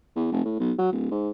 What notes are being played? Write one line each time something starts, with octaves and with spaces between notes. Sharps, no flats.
E2
F1
A2
B1
F#3
D1
G#2